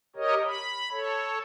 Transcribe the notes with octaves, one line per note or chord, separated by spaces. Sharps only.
G4 A#4 C#5 D#5
B5
A4 C#5